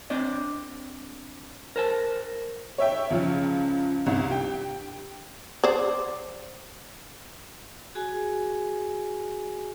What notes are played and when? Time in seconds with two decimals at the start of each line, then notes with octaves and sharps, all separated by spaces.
0.10 C4 D4 D5 D#5
1.76 A#4 C5 A5
2.78 C#5 E5 G5
3.10 C#2 C#3 F3
4.06 G1 C2
4.30 G4 G5
5.64 C5 D5
7.95 F#4 G#4 G#5